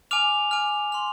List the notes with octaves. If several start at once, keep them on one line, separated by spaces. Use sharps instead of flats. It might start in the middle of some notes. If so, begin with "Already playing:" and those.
G#5 D6 F6 F7
G#5 D6 F6
C6 F6